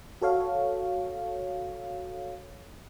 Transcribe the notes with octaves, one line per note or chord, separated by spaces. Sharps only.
F#4 A4 C#5 F5